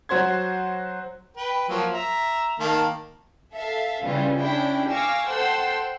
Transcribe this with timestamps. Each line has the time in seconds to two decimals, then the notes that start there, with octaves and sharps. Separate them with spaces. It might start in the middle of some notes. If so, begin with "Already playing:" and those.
0.09 F#3 F#4 C5 C6 G#6
1.37 B4 G5
1.69 F3 F#3 A#3
1.92 E5 A#5
2.60 D#3 A#3 A5
3.52 A4 E5 F5
4.05 C#3 E3 G3 C#4 F4
4.37 C#4 D4 E4 G5
4.89 F5 G#5 C#6 D6 E6 A#6
5.28 A4 C5 F#5 G5 C6 E6